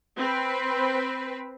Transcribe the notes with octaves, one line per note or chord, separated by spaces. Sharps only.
C4 B4